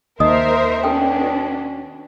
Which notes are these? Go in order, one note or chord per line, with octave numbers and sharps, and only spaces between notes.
D#2 D#4 A#4 C5 D#5 E5 D#6
B2 C#4 D4 A4 G5